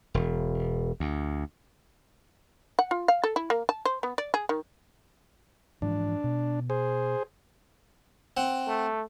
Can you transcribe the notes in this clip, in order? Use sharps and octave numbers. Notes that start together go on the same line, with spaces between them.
E1
D2
F#5
F4
F5
A4
E4
A#3
A5
C5
B3
D5
G#4
D#3
G#2 E3 F3 D4
B2
G#4 C5
C4 F#5
A3